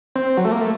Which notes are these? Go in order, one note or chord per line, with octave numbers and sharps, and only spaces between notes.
C4
F#3
A3
A#3
A3